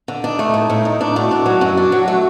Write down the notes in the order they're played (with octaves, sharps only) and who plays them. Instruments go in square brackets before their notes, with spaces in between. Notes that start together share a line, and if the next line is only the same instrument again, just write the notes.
[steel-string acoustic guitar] D3
[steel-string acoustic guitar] D4 [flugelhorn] D#4
[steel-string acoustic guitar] A3
A2
A2
[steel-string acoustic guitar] A2 [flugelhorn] D#4
[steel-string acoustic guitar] D4
[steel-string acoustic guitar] A2 [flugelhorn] F#4
[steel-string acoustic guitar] D4
F#3
F#2
D4
F#3
A3